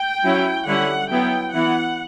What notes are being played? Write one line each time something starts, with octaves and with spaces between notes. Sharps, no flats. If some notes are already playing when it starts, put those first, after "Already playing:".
Already playing: G5
F#3 C#4 E4
D3 G3 C#4 E4 F#5
F#3 B3 E4 G5
E3 B3 E4 F#5